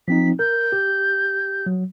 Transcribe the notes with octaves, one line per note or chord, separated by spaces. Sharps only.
F3 C4 D#4 B6
A#4 G6
G4
F#3